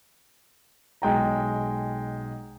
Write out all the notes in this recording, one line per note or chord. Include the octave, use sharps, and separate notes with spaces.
B1 G#3 G5 A#5